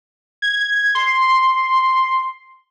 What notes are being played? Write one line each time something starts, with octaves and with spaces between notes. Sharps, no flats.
G#6
C6